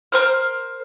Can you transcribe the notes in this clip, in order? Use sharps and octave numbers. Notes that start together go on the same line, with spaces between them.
A#4 C5 F6